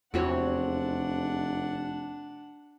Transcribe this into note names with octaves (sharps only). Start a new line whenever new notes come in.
F1 E2 C4 D4 F#4 C#5 F#5